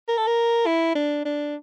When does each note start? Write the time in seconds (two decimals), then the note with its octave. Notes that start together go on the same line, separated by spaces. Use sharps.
0.08 A#4
0.17 A4
0.27 A#4
0.66 E4
0.95 D4
1.25 D4